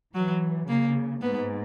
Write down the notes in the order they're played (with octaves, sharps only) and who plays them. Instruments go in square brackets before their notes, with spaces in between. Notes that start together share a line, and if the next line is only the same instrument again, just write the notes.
[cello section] E3 [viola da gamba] F#3
[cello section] C#3 [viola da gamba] A#3
[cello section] G#2 [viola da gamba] B3